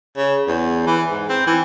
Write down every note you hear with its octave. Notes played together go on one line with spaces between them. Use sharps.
C#3
E2
E3
G#2
C4
E3